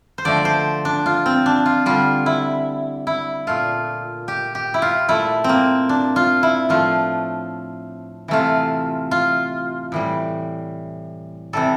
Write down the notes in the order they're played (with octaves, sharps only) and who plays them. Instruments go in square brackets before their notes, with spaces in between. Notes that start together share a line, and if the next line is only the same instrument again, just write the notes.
[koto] C5
D3 F3 A3 D5
C5
D4
F4
C4
D4
F4
D3 G3 F4
E4
E4
A#2 A3 F4
G4
G4
E4
F4
A#2 A3 E4
A#3 C4
D4
F4
E4
A2 F3 A3 F4
C3 E3 A3 F4
F4
A2 E3 G3
C3 E3 G3 A4